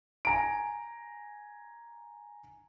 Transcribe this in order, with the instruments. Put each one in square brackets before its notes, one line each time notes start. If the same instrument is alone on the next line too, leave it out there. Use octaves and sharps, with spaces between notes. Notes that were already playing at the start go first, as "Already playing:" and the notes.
[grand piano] G#5 A#5 D7